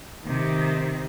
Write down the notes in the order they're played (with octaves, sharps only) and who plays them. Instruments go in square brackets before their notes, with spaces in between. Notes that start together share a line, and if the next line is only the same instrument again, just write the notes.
[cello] C3 D#3